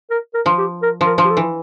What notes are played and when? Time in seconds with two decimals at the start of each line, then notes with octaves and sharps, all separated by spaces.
0.11 A#4
0.34 A#4
0.46 F3
0.58 G4
0.83 A#4
1.01 F3
1.06 A#4
1.18 F3
1.25 G4
1.31 A4
1.37 E3